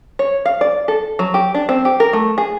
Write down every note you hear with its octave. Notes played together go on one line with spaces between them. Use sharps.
C#5
F5
D5
A4
F#3
G4
D4
C4
G4
A#4
A3
G#4